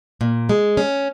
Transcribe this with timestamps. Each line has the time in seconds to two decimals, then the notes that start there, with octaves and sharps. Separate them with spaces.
0.21 A#2
0.49 G#3
0.77 C#4